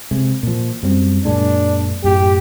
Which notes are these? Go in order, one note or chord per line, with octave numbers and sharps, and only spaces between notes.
C3 G#3
A#2 F3
F#2 G3 C4
F#2 A#2 G#3 D4
F#2 A2 G4